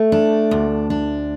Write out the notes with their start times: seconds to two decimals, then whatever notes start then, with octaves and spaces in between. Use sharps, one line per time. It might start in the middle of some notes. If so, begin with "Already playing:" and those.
Already playing: A3
0.12 D4
0.51 D2
0.90 D4